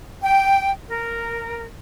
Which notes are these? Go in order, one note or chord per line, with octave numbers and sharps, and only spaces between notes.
G5
A#4